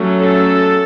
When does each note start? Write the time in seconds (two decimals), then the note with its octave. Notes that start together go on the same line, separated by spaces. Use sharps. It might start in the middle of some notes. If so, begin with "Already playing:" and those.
Already playing: F#3 A3 C#4
0.18 A4